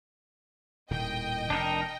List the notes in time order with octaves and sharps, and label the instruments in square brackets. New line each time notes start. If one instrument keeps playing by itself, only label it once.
[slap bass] D#1 A2 D#3 [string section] D#5 G5
[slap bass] F1 [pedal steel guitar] D4 D#4 A#4